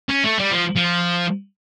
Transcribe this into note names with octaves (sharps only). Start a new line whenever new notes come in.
C#4
A3
G3
F3
F3